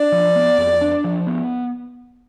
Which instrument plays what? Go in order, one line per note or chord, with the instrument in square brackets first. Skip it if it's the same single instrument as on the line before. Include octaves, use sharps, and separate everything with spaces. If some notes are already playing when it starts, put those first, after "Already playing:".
Already playing: [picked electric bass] D4 [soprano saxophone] D5
[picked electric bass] F3
B3
F2
D4
F3
B3